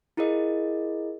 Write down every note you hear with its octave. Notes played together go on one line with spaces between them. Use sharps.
E4 F4 G#4 A#4 D#5